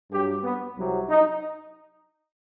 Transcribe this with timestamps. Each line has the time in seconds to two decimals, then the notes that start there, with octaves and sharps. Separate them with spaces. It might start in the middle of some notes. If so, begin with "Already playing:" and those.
0.11 G2 F#3 G4
0.44 B3
0.77 C2 C3 F#3
1.09 D#4